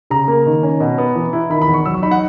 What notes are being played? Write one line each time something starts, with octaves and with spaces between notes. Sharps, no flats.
C#3 A#5
A#3
D#3
C#4
B2
B3
E3
E4
D#3 B5
B5
E2
C#6
F#3 E6
C#6
D#4 B5
F#5